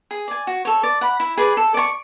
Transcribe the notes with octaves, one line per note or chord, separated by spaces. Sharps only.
G#4
D5 G#5
F#4
A4 C#5
D5
F#5 B5
E4
G#4 B4 D5
A4
D5 A5 C#6